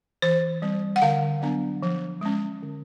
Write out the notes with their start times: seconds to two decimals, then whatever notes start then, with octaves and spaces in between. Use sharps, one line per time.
0.22 E3 C5
0.62 G3 C4
0.96 F#5
1.02 D3 F5
1.41 F#3 B3 D4
1.82 F3
2.21 G#3 C#4
2.63 D3